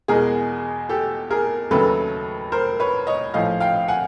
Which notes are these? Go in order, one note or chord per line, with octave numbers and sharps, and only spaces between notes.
E2 B2 G#3 G#4 A#4
G4 A4
G#4 A#4
D#2 C#3 F#3 A3 A4 B4
A#4 C5
B4 C#5
C#5 D#5
A#1 A2 F3 D#5 F5
F5 G5
F#5 G#5